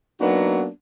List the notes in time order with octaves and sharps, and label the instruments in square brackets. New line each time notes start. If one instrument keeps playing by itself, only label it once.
[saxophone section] F#3 A#3 B3 D4 D#4 F#4